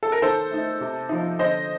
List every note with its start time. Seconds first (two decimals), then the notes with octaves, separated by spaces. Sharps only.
0.03 A4
0.12 A#4
0.22 D#3 A4 C5
0.51 A3 D#4
0.81 C3
1.09 F3 C4 D#4
1.39 D3 C5 D#5